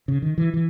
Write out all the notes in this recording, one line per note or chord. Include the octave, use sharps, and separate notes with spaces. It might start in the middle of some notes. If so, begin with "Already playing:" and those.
C#3
D#3
E3
E3